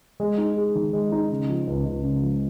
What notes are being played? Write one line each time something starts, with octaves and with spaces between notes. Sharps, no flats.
G#3
D#4
G#4
D#3
G#3
D#4
C#3
F3
C#2
C#2
C#3
F3